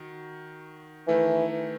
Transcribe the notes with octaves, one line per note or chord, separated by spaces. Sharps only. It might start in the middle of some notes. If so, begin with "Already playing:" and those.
Already playing: D#3 F#4
D#3 E3 A3 E4